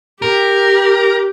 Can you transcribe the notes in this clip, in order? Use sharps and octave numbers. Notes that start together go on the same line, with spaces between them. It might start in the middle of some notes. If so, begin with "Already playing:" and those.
G4 A#4